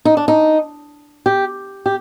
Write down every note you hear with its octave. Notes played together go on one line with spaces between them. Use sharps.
D#4
D4
D#4
G4
G4